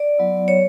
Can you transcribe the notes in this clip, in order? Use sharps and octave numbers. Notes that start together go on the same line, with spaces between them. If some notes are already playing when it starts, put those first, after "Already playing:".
Already playing: D5
F#3 B3 E4
C#5